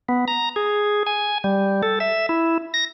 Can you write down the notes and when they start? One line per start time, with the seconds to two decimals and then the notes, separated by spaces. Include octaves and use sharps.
0.09 B3
0.28 A#5
0.56 G#4
1.07 G#5
1.44 G3
1.83 A4
2.00 E5
2.29 E4
2.74 A#6